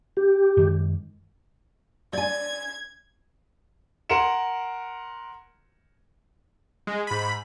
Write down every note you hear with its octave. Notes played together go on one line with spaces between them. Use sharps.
G4
F#2 D#3 G#3
D5 G#5 G#6
A#4 F#5 C6 C#7 E7
G#3
G#2 B5